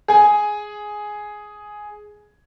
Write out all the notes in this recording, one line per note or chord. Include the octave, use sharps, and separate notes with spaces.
G#4 G#5